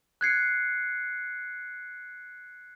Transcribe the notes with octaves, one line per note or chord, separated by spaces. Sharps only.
F#6 G#6 C7 C#7